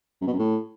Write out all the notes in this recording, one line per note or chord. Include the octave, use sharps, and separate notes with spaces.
F#2
B2
F#2
A2